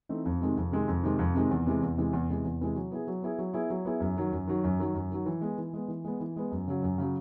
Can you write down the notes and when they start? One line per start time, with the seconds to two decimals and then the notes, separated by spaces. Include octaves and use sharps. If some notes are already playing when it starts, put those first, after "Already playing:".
0.09 E3 A3 C4 D#4
0.26 F2
0.41 C3 D#3 G#3 C4
0.57 F2
0.72 C3 D#3 G#3 C4
0.88 F2
1.04 C3 D#3 G#3 C4
1.19 F2
1.35 C3 D#3 G#3 C4
1.51 E2
1.66 C3 E3 G#3
1.82 E2
1.97 C3 E3 G#3
2.13 E2
2.29 C3 E3 G#3
2.45 E2
2.61 C3 E3 G#3
2.76 F#3
2.91 B3 E4 G#4
3.07 F#3
3.22 B3 E4 G#4
3.39 F#3
3.54 B3 E4 G#4
3.70 F#3
3.85 B3 E4 G#4
4.00 F#2
4.17 D#3 F#3
4.32 F#2
4.47 D#3 F#3
4.64 F#2
4.80 D#3 F#3
4.95 F#2
5.11 D#3 F#3
5.26 E3
5.41 G#3 B3
5.58 E3
5.73 G#3 B3
5.88 E3
6.05 G#3 B3
6.20 E3
6.36 G#3 B3
6.52 F#2
6.67 C#3 F#3
6.83 F#2
6.98 C#3 F#3